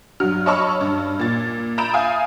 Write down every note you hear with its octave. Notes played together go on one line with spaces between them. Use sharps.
G2 F#3 F6
C#5 D#5 A5 B5 C#6 E6
G2
A#2 A6
A#5 B5 G6 A6 D7 E7
E5 F5 G#5 D#6